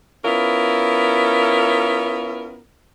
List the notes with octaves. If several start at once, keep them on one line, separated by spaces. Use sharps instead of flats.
B3 C#4 E4 F4 A#4